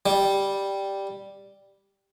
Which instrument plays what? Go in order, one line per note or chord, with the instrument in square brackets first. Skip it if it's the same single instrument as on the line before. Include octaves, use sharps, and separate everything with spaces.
[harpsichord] G3